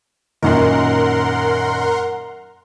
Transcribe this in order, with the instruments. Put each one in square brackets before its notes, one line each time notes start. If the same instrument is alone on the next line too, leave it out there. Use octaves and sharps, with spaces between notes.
[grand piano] F#2 A#2 D#3 [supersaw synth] A#4 F#5 C6